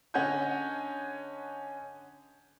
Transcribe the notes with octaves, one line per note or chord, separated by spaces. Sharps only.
D3 C#4 D#5 F#5 G#5 G6